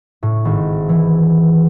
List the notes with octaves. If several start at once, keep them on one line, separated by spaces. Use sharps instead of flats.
A2
G#1
E3